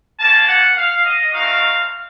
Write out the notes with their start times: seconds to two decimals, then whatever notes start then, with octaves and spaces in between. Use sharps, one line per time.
0.20 A#3 C#4 F4 A5
0.48 F#5
0.77 F5
1.05 D#5
1.32 A3 C4 D#4 F#4 F5